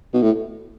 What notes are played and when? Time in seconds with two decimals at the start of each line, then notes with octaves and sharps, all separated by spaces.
0.14 B2
0.22 A2